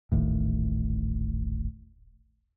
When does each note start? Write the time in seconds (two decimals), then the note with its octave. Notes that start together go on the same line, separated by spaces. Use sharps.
0.12 D#1 A1 D#2 A2